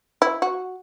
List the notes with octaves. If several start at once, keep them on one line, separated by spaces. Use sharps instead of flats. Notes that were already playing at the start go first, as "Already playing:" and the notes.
E4
F#4